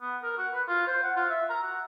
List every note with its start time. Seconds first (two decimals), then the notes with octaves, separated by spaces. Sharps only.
0.01 B3
0.23 A#4
0.37 F#4
0.53 B4
0.68 F4
0.87 C5
1.03 F#5
1.16 F4
1.30 E5
1.50 A#5
1.63 F#4